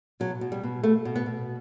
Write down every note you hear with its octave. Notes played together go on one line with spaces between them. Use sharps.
B2 F#3
B2
G3
B2
B2 A3
B2
B3
B2